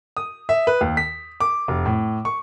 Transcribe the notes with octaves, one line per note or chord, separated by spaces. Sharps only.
D#6
E5
B4
D#2
B6
D6
F1
A2
C#6